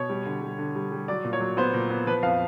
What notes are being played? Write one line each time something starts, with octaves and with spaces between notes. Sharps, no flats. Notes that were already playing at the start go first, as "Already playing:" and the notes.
Already playing: B2 C#5
G3
D3
G3
D3
G3
G3
F#3 D5
A#2
C#5
F#3
B3 C5
A#2
B3
F3 B4
F2 F5